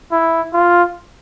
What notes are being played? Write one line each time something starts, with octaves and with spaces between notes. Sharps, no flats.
E4
F4